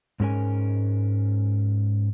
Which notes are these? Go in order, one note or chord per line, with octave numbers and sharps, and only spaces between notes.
G#2 G#3 C#4 A#4 G#5